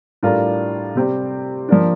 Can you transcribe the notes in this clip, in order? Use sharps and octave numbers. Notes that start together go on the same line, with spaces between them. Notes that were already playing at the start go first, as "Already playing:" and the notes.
A2 G3 D4 F4 A#4
C3 G3 C4 G4
F3 A#3 D4